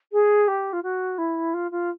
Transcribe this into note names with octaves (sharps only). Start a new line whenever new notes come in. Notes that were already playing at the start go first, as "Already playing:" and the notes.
G#4
G4
F4
F#4
E4
F4
F4